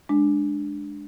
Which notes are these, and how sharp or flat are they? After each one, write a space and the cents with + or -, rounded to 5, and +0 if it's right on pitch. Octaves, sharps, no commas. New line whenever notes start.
G#3 +0 D4 +0